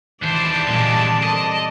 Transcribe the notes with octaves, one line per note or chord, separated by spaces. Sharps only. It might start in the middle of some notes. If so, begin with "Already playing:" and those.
D#2 E3 C5 D5 A5
A#2 D3 G3 G#3 C4
A4 A#4 C5 D#5